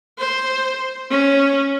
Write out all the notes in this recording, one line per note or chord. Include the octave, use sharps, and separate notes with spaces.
C5
C#4